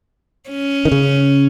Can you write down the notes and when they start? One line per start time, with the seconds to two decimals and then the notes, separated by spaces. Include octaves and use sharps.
0.50 C#4
0.85 D#3
0.92 C#3